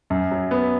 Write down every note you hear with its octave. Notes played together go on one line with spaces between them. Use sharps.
F#2
F#3
B3